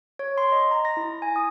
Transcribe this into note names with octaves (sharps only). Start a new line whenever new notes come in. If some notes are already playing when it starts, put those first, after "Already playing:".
C#5
C6
D#5
A#5
A#6
E4
G#5
D#6